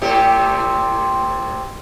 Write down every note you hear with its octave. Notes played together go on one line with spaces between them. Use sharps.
A2 C3 G4